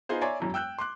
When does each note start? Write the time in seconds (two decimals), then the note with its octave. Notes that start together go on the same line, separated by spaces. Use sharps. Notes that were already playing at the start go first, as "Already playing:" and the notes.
0.09 B3 D#4 F4 G#4 C5
0.21 C#5 D5 E5 G#5 A#5 C6
0.40 E1 F#2 E4
0.54 G5 E6 F#6 G6
0.79 C6 D6 F#6